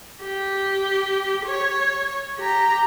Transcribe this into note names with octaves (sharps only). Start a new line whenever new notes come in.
G4
C#5
G4 A#5